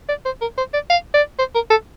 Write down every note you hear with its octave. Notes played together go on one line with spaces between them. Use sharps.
D5
C5
A#4
C5
D5
F5
D5
C5
A#4
A4